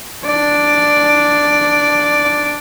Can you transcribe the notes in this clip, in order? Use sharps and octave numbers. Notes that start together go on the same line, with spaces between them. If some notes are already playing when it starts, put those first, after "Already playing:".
D4 D5